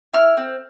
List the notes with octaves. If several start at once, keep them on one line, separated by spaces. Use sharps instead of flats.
E4 F6
C4